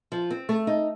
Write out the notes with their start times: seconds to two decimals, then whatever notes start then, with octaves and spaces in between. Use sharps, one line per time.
0.12 F3
0.30 C4
0.49 A3
0.67 D#4